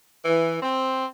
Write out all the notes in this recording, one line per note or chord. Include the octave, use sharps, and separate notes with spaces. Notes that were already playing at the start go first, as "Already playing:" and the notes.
E3
C4